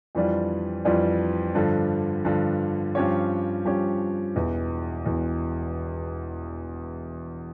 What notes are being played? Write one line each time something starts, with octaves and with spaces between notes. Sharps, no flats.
F2 E3 G3 D4 F4
F2 E3 G3 D4 F4
G2 D3 F3
G2 D3 F3
G2 F3 C#4 G4 C#5
G2 F3 C#4 G4 C#5
E1 E2 E3
E1 E2 E3